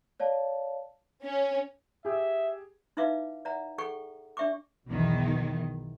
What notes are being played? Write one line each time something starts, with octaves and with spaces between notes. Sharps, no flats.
C#5 D5 F5 A5
C#4
G4 G#4 E5
D#4 E4 B4 E5 F5 D6
D5 E5 F#5 A#5
G#4 A4 F#5 G5 C#6
D4 D5 E5 G5 C#6 D6
B1 E2 D#3